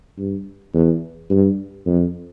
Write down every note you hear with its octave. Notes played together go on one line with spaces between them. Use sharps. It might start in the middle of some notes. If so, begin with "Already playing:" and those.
G2
E2
G2
F2